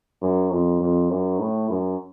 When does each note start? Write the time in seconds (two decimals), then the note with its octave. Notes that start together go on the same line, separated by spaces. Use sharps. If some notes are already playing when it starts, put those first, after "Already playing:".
0.22 F#2
0.51 F2
0.81 F2
1.11 F#2
1.40 A2
1.70 F#2